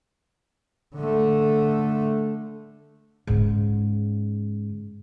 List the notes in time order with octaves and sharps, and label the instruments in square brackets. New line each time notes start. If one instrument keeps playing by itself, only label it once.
[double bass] D3 A3
[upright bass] G#2 C#3